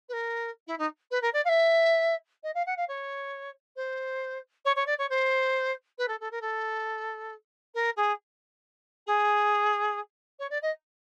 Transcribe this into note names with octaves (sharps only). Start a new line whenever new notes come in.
B4
A#4
E4
D#4
B4
A#4
D5
F5
E5
D#5
F5
F#5
F5
C#5
C5
C#5
C#5
D5
C#5
C5
B4
A4
A4
A#4
A4
A#4
G#4
G#4
C#5
D5
D#5